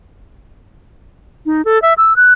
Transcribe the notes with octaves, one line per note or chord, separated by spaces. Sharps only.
D#4
A4
E5
E6
F#6